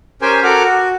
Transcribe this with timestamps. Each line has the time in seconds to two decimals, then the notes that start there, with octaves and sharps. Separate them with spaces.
0.22 C#4 G4 A#4 C5 G5 G#5
0.43 F#4 A4 A#4 F#5 D6 F6
0.63 F#4